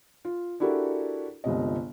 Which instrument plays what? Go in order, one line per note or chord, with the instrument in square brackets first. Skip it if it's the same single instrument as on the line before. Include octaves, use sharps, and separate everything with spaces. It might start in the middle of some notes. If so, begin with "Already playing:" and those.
[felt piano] F4
D4 E4 F#4 G4 A4 A#4
G1 C#2 C3 D#5